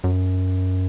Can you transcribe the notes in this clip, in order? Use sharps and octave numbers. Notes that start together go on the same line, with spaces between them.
F#2